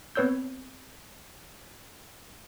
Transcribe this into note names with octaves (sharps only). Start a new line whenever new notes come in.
B3 C4 B4 C#5 E6 G6